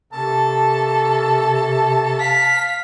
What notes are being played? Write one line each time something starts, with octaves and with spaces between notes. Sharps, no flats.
C3 A#3 C#4 A4 A5
F5 B6